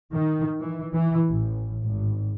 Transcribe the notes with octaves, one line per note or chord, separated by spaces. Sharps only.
D#3
E3
E3
A1
G#1